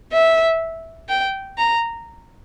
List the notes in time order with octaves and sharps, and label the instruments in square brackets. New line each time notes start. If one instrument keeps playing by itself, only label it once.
[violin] E5
G5
A#5